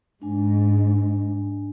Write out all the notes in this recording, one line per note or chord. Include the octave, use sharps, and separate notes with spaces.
G#2 D4 G#5